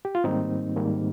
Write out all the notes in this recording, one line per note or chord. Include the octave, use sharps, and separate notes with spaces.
G4
F4
G#2 D#3 G3 A#3 C4 D#4
G#2 D#3 G3 A#3